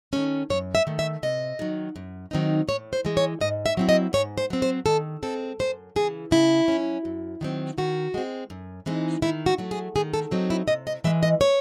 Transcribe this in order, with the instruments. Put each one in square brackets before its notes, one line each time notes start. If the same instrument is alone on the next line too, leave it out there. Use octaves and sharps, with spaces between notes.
[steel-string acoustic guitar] D#3 A3 C#4 C#5
F#2 C#5
E5
D#3 A3
E5
C3 D#5
D#3 F#3
F#2
D#3 F#3 C4 D#4
A2 C#5
C5
E3 G#3
C#5
G#2 D#5
E5
F#3 C4 E4
D#5
G#2 C#5
C5
F#3 C4
C5
D#3 A4
G#3 C4 A4
F#2 C5
C#3 E3 G#4
C#3 E4
F#3 C#4
F#2
D#3 F#3 C4
D#3 F#4
G#3 C4
F#2
E3 G#3 C4 D#4
D#3 E4
F#4
F#3 A3
G#4
D#3 G#4
A4
F#3 C4 D#4
E4
C3 D#5
D#5
E3 G#3 E5
D#5
C#5